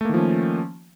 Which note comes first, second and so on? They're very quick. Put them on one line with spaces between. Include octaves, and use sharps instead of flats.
A3 A#3 D#3 F3 C#4